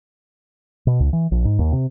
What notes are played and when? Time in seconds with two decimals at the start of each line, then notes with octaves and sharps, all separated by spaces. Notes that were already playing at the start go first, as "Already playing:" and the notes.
0.87 B2
1.00 C#2
1.13 E3
1.31 A#1
1.45 G#2
1.59 D#2
1.72 C3